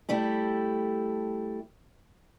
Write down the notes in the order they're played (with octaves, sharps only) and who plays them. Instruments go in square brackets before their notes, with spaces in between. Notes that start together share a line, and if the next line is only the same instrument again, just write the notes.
[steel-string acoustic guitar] G3 A3 E4 G4